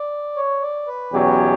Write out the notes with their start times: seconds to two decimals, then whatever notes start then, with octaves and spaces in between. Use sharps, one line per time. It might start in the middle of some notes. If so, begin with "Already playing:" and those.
Already playing: D5
0.36 C#5
0.62 D5
0.88 B4
1.13 E2 B2 F#3 C#4 G4 D5
1.21 C#5
1.28 B4
1.37 C#5